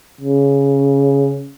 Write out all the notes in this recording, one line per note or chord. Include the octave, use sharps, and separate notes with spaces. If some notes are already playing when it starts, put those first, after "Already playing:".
C#3